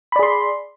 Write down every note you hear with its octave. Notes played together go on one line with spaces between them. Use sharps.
G#4 D5 B5 C6